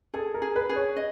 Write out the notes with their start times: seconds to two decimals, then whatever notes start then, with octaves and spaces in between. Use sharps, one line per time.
0.14 G#4 A4
0.34 A#4
0.42 G#4
0.56 B4
0.69 G#4
0.76 C#5
0.97 D#5